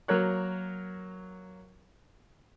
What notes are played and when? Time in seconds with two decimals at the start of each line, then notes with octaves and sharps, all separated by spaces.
0.08 F#3 A#3 A#4 C#5 F#6